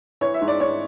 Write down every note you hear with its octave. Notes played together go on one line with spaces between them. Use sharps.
E3 C#5
E5
G#2
D5
G#2 C#5